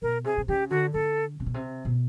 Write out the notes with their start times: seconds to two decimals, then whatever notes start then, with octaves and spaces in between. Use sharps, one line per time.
0.02 B2 A#4
0.24 C3 G#4
0.38 C3
0.48 C#3 G4
0.70 D3 F#4
0.93 D3 A4
1.40 C3
1.46 B2
1.54 C3
1.85 B2